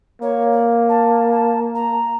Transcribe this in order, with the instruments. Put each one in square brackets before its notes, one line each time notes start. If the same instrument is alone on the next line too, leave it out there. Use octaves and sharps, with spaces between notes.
[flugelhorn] A#3 [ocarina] C#5
[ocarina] D5
A5
A5
A#5